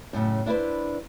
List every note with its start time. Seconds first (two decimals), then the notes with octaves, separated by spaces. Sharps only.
0.13 F#2 A2 C#3
0.46 D4 E4 B4 C5